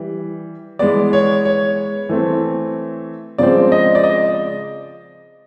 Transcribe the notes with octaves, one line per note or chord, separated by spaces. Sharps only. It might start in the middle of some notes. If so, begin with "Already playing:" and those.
Already playing: E3 G3
E3 G#3 B3 D5
C#5
C#5
E3 A3 C4
C#3 F3 G#3 C4 D5
D#5
D5
D#5